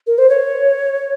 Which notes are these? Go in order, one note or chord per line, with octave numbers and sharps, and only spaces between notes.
A#4
C5
C#5